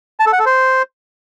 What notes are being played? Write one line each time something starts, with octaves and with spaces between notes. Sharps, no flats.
A5
A4
F#5
A4
C5